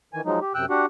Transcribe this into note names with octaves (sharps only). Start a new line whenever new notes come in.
D#3 E3 G#5
F3 F#3 G#3 D#4
G4
F#2 C3 G5 E6 F#6
D4 F#4 G4 F#5